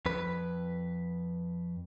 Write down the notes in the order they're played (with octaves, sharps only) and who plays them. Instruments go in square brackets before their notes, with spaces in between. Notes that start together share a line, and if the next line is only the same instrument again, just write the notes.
[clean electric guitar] F2 B4